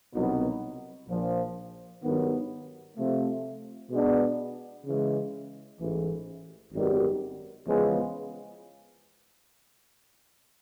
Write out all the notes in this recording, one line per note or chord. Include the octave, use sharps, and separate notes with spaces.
C2 B2 F#3 B3 D#4
A#1 A#2 F3
G2 D#3 F#3 B3
C3 F3 A3
B2 G#3 B3 D4
C#3 E3 G#3
A1 G#2 E3
G#1 F#2 D#3 G3 B3
E2 C#3 F3 G#3 B3